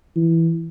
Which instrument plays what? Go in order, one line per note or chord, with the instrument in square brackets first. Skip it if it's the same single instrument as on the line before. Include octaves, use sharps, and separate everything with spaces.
[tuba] E3